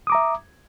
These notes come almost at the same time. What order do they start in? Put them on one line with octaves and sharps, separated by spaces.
D#6 D6 A#5 E5